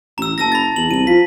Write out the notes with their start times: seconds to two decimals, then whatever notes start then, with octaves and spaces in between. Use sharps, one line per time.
0.18 A1 A#5 E6
0.38 F#1 A5 E6 A#6
0.52 B5 A6
0.76 E2 F#7
0.91 C2 D#7 F#7
1.07 F3 B6